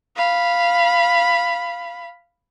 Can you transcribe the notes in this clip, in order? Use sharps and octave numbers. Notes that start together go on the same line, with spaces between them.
F5 B5